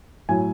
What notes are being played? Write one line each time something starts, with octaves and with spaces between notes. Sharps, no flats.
A2 F#3 G#5